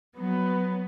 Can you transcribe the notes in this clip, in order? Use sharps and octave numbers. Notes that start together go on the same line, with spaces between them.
F#3 B3